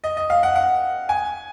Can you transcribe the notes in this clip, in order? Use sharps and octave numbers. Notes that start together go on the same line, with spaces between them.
D#5
D#5
F5
F#5
F#5
G#5